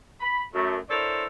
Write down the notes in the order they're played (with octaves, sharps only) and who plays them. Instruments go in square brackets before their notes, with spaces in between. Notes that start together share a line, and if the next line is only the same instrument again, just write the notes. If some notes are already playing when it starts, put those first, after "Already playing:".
[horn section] B5
F#2 A3
D4 E4 A4 A#4 C5 C#5